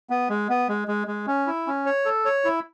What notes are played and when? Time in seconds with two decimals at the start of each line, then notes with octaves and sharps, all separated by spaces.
0.10 B3
0.29 G#3
0.49 B3
0.69 G#3
0.88 G#3
1.08 G#3
1.27 C#4
1.46 E4
1.67 C#4
1.86 C#5
2.05 A4
2.25 C#5
2.45 E4